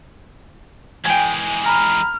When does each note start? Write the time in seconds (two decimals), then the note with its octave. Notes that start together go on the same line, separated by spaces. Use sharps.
1.05 E3 G#3 G5 G#5
1.66 A#5 B5 F6